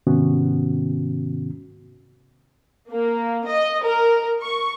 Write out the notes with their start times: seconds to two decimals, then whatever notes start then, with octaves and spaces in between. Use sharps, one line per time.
0.07 G#2 C3 D#3 B3 C#4 F#4
2.91 A#3
3.48 D#5
3.85 A#4
4.42 C#6